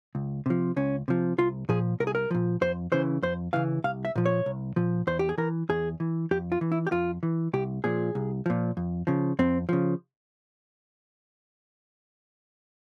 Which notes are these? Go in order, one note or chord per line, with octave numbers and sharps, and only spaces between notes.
C#2
C3 F3
C#2 C#4
C3 F3
C2 F4
A#2 F3 G#4
C2 A#4
G#4
A#4
A#2 F3
F2 C5
C#3 E3 C5
F2 C5
C#3 E3 F5
C2 F5
E5
A#2 F3
C#5
C2
A#2 F3
E2 C5
G4
G#4
E3 A#4
E2 G#4
E3
F2 G4
F4
E3
E4
G4
F2 F4
E3
C2 G4
A#2 F3 G#4
C2
A#2 F3
F2
C#3 F3
F2 C4
C#3 F3